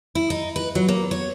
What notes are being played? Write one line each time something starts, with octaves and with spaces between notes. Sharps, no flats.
E4
D#4
B4
F#3
A#3
C#5